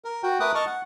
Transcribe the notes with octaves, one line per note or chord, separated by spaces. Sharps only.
A#4
F#4 G5
A3 A#4 B4 D6 D#6 F#6
D#5 A5 C#6 F6
F#5